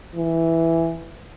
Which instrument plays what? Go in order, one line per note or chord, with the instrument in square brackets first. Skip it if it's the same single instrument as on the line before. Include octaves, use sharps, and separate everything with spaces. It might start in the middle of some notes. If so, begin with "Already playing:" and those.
[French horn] E3